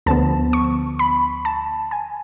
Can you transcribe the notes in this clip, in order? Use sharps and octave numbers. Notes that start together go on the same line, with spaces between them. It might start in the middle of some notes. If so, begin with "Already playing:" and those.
D2 D3 F3 B3 A5
C#6
B5
A5
G#5